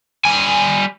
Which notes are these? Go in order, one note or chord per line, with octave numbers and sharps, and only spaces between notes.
G3 G#5